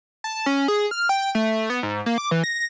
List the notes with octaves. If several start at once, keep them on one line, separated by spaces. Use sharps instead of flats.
A5
C#4
G#4
F6
G5
A3
B3
G#2
A#3
D6
E3
A#6